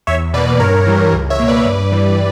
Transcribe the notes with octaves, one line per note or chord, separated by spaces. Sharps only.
E2 C#5 E5
B2 A#3 B4 D5
G2 A#4 C#5
E3 G3
C#2
C#5 E5
B2 A#3
B4 D5
G2
E3 G3